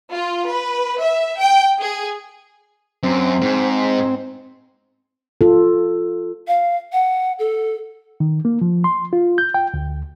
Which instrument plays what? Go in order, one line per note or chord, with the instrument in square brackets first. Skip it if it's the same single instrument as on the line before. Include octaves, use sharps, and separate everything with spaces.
[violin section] F4
B4
E5
G5
G#4
[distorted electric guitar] F#2 [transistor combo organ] C4
[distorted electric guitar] G#2
[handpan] F4 A4
[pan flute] F5
F#5
A4
[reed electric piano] D#3
A#3
F3
C6
F4
G6
G5
D2